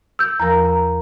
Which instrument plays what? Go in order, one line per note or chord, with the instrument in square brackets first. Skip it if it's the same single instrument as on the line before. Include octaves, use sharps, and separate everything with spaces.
[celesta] E6 G6
[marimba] E2 F3 A#4 [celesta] A#5
[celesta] A#5